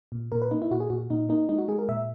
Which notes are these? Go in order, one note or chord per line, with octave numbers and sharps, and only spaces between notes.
A#2
A#2 A#4
B4
A#3 D#4
E4
A#2 F#4
G#4
A#2 F#4
A#2 D#4
A#3 D#4
G#3 D#4
F#4
G#3 G#4
A#4
A#2 E5